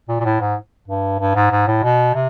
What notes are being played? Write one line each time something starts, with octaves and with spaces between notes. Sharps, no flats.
A#2
A#2
A2
G#2
G2
G2
G#2
G#2
A2
B2
C3